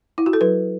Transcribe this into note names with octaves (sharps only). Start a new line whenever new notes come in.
E4
F#4
A4
F#3 B4